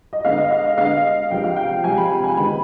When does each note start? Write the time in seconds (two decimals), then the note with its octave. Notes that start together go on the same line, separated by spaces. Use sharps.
0.13 D#5
0.24 D3 G#3 B3 F5
0.38 D#5
0.51 F5
0.65 D#5
0.78 D3 G#3 B3 F5
1.31 C3 F3 G#3 G5
1.44 F5
1.56 G5
1.84 C3 F3 G#3 G#5
1.98 B5
2.11 B5
2.24 G#5
2.37 D#3 G#3 B3 B5